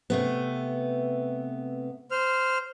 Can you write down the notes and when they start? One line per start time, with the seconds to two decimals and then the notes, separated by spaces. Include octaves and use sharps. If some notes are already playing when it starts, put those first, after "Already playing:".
0.10 C3 A3 B3
2.11 C5 F6